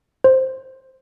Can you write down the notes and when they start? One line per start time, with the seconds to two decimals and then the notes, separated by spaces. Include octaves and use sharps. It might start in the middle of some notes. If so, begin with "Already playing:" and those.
0.24 C5